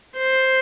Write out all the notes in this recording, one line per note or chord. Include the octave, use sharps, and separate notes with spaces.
C5